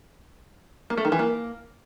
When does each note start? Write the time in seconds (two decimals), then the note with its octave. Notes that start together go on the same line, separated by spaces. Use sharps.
0.90 A#3
0.97 A3
1.05 D#3
1.12 E3
1.19 A#3